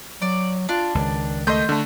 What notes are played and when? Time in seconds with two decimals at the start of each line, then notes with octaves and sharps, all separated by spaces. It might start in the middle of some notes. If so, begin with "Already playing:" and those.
0.22 F#3 D5
0.69 D4 F4
0.95 C#2 D#3
1.47 A3 D#5 C6 G6
1.69 D3 A3